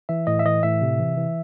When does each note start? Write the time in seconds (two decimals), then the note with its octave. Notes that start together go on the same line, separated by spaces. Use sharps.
0.09 E3 E5
0.27 A2 D#5
0.39 E5
0.45 E3 D#5
0.63 A2 E5
0.81 C3
0.99 E3
1.17 E3